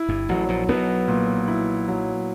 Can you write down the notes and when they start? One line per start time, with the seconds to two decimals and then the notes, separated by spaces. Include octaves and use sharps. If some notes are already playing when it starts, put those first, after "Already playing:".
Already playing: E4
0.08 G1 G2
0.29 A1 A2 F#3
0.49 A#1 A#2
0.68 B1 B2 B3
1.08 A#2
1.48 E4
1.88 F#3